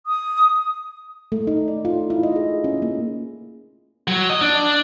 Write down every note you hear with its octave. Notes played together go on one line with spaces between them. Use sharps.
D#6
A3
D#4
D5
F4
E4
D#5
G#4
C#4
A#3
F#3
D#5
D4